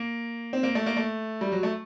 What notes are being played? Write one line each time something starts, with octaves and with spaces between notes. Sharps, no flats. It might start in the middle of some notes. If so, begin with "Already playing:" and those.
Already playing: A#3
C4
A#3
A3
A#3
A3
G3
F#3
A3